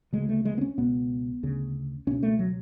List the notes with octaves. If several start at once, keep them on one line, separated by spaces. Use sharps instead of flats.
D2 C#3 G#3
A3
G#3
B3
C#4
C#2 B2 B3
D2 C#3
C#2 B2 C#4
A3
F#3